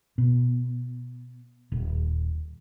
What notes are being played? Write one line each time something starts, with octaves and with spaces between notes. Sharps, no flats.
B2
D#1